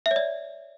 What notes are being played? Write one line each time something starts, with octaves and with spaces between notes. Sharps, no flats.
E5
C#5
D5